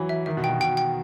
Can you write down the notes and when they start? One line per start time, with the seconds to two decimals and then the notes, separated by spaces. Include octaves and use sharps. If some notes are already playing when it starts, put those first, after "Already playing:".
Already playing: E3 F#3 B5
0.09 E5
0.26 D#3 E5
0.37 B2
0.44 G5
0.49 B2
0.60 B2 G5
0.77 G5